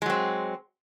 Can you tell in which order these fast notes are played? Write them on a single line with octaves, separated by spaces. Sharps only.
G#3 F#3 C4